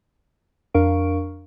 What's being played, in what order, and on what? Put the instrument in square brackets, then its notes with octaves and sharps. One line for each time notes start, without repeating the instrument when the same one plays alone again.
[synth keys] F2 D4 A#4 F5 C#6 D7